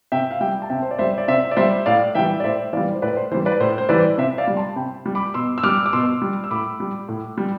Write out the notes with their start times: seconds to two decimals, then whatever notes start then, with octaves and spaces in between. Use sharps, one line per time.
0.12 C3 E5 G5
0.31 F5
0.41 G3 E5 G5
0.62 A5
0.70 C3 E5 G5
0.82 C5
0.91 D5
0.98 G3 C5 E5
1.18 D5
1.28 C3 C5 E5
1.51 D5
1.56 G3 C5 E5
1.86 A2 D5 F5
2.15 E3 G3 E5 G5
2.40 D5
2.44 A2 C5 E5
2.73 E3 D5 F5
2.77 G3
2.93 C5
3.02 A2 B4 D5
3.16 C5
3.31 E3 C5
3.34 G3
3.46 B4 D5
3.60 A2 C5
3.78 C5
3.89 E3 G3 B4 D5
4.18 C3 C5 E5
4.38 D5 F5
4.48 G3
4.57 A5 C6
4.76 C3 G5 B5
5.06 G3
5.15 B5 D6
5.34 B2 C6 E6
5.58 E6
5.63 G3 D6 F6
5.86 D6
5.93 B2 C6 E6
6.22 G3
6.44 E6
6.51 A2 B5 D6
6.80 G3
7.08 A2
7.38 G3